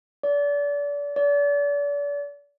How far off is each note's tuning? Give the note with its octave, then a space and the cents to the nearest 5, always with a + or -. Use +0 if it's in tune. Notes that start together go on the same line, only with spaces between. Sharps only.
D5 -30
D5 -35